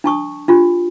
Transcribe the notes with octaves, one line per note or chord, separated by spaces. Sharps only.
D4 A5 C#6 D#6
D4 F4 G4